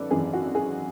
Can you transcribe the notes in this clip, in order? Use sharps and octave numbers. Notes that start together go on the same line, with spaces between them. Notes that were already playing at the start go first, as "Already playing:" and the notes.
Already playing: G#1 F#2 A4 B4 D5
G#1 F#2 E3 G#4
F#4
G#4